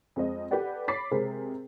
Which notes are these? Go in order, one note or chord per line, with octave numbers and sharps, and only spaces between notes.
F2 G#3 C4 D#5
G4 A4 B4 D5 F#5
C#5 B5 D6 A6 B6 C7
C3 G#3 C4 G#4 A#4